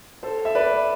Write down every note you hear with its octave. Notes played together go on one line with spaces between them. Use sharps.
A4 C5
E5
B4 D5